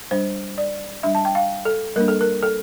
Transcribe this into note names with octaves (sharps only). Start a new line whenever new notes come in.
G3 D4 C5
D5
G3 D4 E5
A5
G5
F5
A4
G3 A#3 D4 A#4
A4
A#4
A4